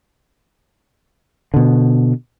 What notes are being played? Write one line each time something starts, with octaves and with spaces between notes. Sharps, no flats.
B2 D3